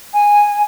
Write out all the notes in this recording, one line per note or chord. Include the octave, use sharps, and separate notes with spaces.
G#5